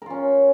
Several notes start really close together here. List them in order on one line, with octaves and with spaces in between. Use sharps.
A#4 F4 C#4